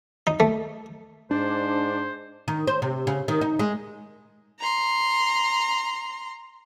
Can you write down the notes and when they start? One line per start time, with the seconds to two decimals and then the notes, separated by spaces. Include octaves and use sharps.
0.27 D#4
0.40 A3
1.31 G#2 D4 C5
2.48 D#3
2.67 C5
2.82 C3
3.07 C#3
3.28 D#3
3.41 D#4
3.59 G#3
4.60 A#5 C6